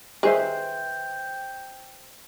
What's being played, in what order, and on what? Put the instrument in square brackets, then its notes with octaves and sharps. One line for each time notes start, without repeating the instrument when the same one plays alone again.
[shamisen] D#3 G#4 [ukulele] B4 C5 E5 [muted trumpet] G5